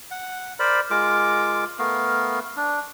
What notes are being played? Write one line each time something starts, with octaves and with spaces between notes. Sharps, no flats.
F#5
A#4 C5 D5 B5
G#3 F4 A#4 D6
A3 B3 A#4 F5
D4